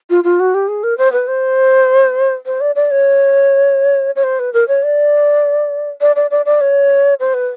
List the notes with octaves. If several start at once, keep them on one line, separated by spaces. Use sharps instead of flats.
F4
F4
F#4
G4
G#4
A#4
C5
B4
C5
C5
D5
D5
C#5
C#5
C5
B4
A#4
C#5
D5
D5
D5
D5
D5
C#5
C5
B4